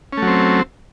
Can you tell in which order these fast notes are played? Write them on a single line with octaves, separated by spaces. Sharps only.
C#4 A3 F#3 C4